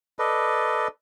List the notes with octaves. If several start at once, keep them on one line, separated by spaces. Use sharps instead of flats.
A4 B4 D5 D#5